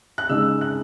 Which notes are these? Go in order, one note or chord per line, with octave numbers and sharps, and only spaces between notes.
F#6
C#3 G#3 D#4 E6
F#6